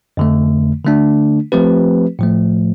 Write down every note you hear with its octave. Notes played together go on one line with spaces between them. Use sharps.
F2 D3 A3
D3 A3 D4
F3 A3 C4 G4 B4
A2 F3 A3